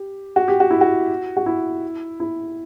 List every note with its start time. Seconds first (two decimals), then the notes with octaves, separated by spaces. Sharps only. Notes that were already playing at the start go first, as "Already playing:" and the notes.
Already playing: G4
0.36 F#4
0.48 G4
0.60 F#4
0.70 E4
0.81 F#4
1.37 F#4
1.46 E4
2.20 E4